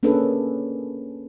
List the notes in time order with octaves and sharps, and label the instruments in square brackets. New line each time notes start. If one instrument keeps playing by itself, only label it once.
[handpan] A#3 C#4 D4 G#4 A4 B4